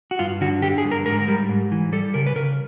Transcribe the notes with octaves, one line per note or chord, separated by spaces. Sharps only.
F#4
G2 F4
D3 F#4
D3 G4
G#4
G2
A#4
G#2 A#4
G3
G#2
E3
G3 A4
C#3 A#4
B4
C#3 A#4